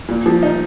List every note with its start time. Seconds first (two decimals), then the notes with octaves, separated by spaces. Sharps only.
0.08 A#2
0.26 F3
0.43 D#4